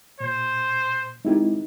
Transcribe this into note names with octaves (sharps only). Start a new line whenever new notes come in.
A#2 C5
G#3 C4 D#4 E4 G4